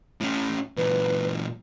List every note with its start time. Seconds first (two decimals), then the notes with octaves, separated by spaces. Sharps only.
0.21 A2 C#4
0.77 A#2 E3 B4